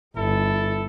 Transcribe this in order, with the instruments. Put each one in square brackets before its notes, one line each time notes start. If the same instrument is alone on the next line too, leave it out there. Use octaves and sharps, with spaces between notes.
[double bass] G1 [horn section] E4 A4